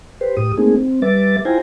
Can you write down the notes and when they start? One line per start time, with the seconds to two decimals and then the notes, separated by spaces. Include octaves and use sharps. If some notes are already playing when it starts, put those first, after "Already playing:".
0.21 G4 B4 C5
0.37 A2 G4 D#6
0.57 A3 A#3 C4 D#4 G#4
0.75 C4
1.02 G3 B4 E5 D6 A6
1.45 E4 F4 C5 G5 G#5 A#5